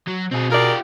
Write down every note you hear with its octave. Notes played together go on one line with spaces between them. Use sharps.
F#3
B2 C4 G#4
F4 G4 G#4 A#4 D5